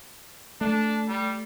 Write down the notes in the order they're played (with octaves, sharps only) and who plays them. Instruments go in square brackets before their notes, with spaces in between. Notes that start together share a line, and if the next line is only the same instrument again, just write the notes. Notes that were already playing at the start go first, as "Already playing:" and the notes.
[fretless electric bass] A3 [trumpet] D4
[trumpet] G3